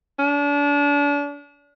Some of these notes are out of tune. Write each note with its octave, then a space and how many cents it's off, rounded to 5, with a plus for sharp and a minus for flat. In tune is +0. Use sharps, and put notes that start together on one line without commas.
D4 -35